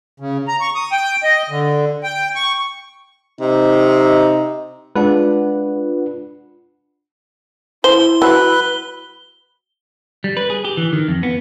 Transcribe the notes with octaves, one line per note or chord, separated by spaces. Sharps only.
C#3
A#5
C#6
D#6
G5
D#5
D3
G5
C#6
C3 D#4
G#3 D4 F4 B4 F#5
E4 C5 G7
F#3 B4
G3
B4
G#4
G4
E3
D#3
F2
B3